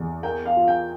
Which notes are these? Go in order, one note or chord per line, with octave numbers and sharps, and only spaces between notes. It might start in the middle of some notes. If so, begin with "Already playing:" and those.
Already playing: E2 E3
A#4 G5
F5
F4
G5